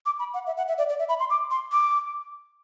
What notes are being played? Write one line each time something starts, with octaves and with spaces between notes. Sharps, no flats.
D6
B5
F#5
E5
F#5
E5
D5
D5
E5
B5
C6
D6
C6
D6